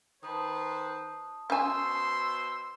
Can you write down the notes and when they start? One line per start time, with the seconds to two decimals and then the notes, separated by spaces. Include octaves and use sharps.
0.23 D#3 B4 C5 A5 D#6
1.50 B2 C#4 C5 G#5 C6 E6